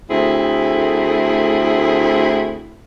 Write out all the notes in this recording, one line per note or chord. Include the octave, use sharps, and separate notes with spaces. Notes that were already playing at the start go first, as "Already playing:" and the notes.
D2 A3 C4 E4 G#4